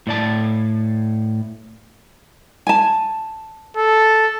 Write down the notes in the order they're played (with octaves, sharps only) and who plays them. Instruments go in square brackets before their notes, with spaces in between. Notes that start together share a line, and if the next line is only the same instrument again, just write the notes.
[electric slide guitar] A2 D5 A5
[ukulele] G#5 A5
[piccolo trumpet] A4